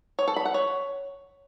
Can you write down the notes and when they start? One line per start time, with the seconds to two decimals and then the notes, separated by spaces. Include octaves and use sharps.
0.19 C#5
0.28 A4
0.36 B5
0.45 F#5
0.54 C#5